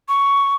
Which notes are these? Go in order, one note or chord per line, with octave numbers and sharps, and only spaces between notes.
C#6